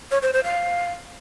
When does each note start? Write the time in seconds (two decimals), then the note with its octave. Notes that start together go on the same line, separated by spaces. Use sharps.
0.11 C#5
0.22 C5
0.33 C5
0.44 F5